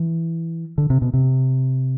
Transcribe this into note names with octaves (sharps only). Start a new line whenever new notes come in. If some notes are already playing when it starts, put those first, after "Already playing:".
Already playing: E3
D3
C3
B2
C3